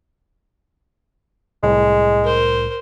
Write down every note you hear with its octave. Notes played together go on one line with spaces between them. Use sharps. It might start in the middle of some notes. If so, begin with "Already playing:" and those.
C2 A2 G#3
A#4 C5